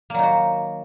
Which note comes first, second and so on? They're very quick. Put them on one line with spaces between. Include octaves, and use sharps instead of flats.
A#3 F#3 D#3 F#4